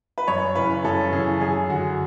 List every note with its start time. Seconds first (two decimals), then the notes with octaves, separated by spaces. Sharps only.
0.18 B4
0.28 F#2 C#5
0.55 C#3 E3 B4
0.85 F#2 A4
1.13 C#3 E3 G#4
1.41 F#2 G#4
1.70 D3 F#4